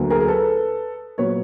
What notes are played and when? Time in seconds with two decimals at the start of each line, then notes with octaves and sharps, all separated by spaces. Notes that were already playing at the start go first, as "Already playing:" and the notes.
Already playing: D2 F#3 A#3
0.10 G#4 A#4
0.21 A#4
0.28 A4 B4
1.18 A#2 F#3 B3 B4 C#5